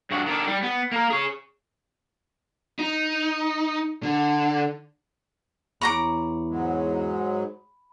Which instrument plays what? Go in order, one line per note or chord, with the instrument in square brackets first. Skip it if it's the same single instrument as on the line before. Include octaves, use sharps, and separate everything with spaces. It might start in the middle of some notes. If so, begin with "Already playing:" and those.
[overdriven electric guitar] G2 F#4
D#3 D4
G3
B3
A#3 A#4
G#4 C#5
[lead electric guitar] D#4
D3
[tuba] E2 [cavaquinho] C#5 A#5 D6 [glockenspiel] B5
[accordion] G#2 F#3 G#3